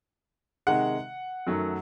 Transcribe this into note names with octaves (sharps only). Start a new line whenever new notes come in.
C3 D#3 G#3 F#5
F#2 D#3 F#3 A3